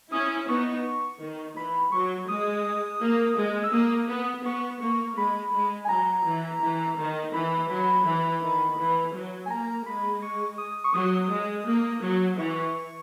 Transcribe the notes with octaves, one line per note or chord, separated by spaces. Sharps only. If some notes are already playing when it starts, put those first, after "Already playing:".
C#4 E4 D#6
B3 D#4 C#6
D#3
E3 B5
F#3 C#6
G#3 D#6
A#3
G#3
E6
A#3 D#6
B3
B3 C#6
A#3 C#6
G#3 B5
G#3
G#5
F#3 A#5
E3
E3
D#3
E3 B5
F#3 B5
E3
D#3
E3
F#3
G#5
A#3 A#5
G#3 B5
C#6
D#6
C#6
F#3 D#6
G#3
A#3
F#3
E3 C#6